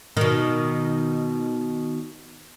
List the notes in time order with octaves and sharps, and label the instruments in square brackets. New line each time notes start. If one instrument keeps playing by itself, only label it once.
[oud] B2 D#3